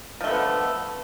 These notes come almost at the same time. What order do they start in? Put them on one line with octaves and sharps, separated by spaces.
F3 A3 D3 B3